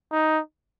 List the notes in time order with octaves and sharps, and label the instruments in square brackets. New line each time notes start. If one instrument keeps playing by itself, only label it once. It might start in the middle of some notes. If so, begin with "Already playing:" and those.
[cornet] D#4